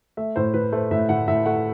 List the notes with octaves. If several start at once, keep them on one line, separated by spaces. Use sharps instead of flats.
A3 E5
A2 C5
A2 B4
A3 C5
A2 E5
A2 F#5
A2 E5
A3 F#5